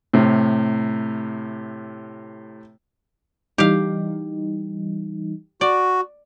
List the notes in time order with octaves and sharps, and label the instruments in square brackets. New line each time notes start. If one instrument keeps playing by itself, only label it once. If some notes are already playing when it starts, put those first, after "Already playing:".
[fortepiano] A2 C3
[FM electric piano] E3 G3 D#4 [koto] G4 F5
[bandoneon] F#4 [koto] D5